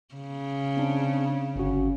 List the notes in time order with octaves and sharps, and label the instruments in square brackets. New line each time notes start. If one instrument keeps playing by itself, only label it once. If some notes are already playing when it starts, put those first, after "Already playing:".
[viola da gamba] C#3
[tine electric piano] C4 D4
G1 C#4 F#4